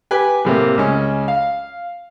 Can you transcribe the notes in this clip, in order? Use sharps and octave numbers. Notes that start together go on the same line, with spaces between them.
G4 B4 G#5
A2 C3 A#3
C#2 C#4
F5